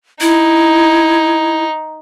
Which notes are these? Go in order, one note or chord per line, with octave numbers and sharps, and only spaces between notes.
D#4 E4